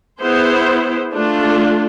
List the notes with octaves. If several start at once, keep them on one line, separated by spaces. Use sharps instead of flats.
B3 E4 G#4 C5
A3 D4 F4